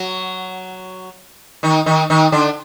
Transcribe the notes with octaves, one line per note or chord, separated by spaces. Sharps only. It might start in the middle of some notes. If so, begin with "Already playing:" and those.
Already playing: F#3 F#4
D#3 D#4
D#3 D#4
D#3 D#4
D3 D4